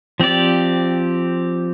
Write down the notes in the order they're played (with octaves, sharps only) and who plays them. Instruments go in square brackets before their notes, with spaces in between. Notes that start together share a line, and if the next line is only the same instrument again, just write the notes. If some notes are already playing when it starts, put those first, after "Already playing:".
[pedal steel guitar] F3 C4 G4 D5